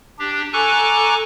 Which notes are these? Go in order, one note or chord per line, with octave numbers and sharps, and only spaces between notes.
D4 G4
A4 G#5 A#5 C#6 D6 F#6